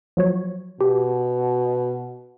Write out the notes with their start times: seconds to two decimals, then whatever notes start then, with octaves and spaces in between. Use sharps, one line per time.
0.17 F3 F#3 C#5
0.81 B2 G4